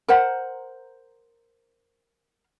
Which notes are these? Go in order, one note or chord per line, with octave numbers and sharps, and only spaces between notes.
A#4 C5 F#5